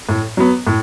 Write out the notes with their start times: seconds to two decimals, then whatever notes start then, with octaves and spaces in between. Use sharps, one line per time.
0.09 A2
0.37 F#3 B3
0.67 A2